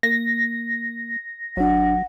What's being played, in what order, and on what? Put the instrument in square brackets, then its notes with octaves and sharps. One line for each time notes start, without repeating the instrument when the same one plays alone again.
[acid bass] A#3 [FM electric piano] A#6
[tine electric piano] G1 D4 [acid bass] F#3 [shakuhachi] F#5